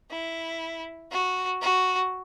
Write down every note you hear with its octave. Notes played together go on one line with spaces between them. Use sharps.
E4
F#4
F#4